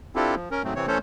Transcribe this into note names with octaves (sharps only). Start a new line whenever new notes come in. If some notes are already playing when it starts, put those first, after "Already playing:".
C4 D4 E4 F4 G4 A4
F3
C#4 A#4
G#2 F#3 A3 C4
C3 E3 C4 C#5
E3 A3 C#4 A4 C5 C#5